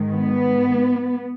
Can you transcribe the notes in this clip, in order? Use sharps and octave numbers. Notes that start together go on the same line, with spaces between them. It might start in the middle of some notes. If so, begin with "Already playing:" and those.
Already playing: G#2 D#3 G#3
B3